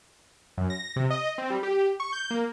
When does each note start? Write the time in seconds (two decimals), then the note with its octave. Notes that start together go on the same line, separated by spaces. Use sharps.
0.57 F#2
0.70 A#6
0.96 C3
1.10 D#5
1.38 C4
1.50 G3
1.63 G4
2.00 C#6
2.12 G6
2.30 A#3